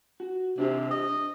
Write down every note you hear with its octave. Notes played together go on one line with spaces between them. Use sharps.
F#4
C3 D4 G4 C5
D#5